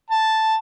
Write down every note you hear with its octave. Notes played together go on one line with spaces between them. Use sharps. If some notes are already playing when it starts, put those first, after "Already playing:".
A5